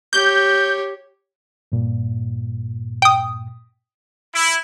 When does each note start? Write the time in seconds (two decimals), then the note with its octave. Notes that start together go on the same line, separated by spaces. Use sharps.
0.13 G4 C#5 G6
1.72 G2 A#2
3.02 G5 D#6
4.35 E4